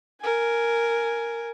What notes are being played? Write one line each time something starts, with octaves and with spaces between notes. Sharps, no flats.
A#4 G#5